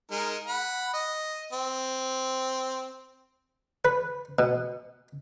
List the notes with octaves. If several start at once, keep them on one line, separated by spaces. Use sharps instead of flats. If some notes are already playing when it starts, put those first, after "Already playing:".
G#3 D#4 A#4
F#5 B5
D#5
C4
B4
B2